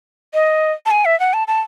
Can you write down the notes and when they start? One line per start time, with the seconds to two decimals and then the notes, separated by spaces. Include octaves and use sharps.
0.34 D#5
0.86 A5
0.91 G#5
1.05 E5
1.20 F#5
1.33 A5
1.48 A5